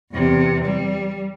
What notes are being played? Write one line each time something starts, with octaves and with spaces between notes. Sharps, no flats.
E2 C3
G3